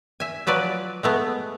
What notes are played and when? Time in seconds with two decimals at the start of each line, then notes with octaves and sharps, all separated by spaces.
0.20 E5 G#5
0.47 F3 F#3 B4 D5
1.03 G#3 A3 B3